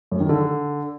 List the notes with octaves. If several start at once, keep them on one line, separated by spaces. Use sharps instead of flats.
F#2
D#3
D3